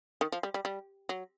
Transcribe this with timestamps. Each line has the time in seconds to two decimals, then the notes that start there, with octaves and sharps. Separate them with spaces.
0.21 D#3
0.32 F3
0.43 G3
0.54 G3
0.65 G3
1.09 F#3